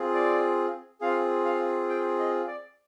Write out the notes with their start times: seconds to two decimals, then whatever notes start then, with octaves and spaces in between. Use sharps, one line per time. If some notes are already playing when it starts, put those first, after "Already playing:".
Already playing: C4 F4 G#4
0.14 D5
1.01 C4 F4 G#4 F5
1.45 F5
1.90 G5
2.19 D#5
2.47 D5